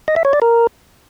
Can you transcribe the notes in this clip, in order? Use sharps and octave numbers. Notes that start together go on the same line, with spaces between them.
D#5
E5
C#5
D5
A#4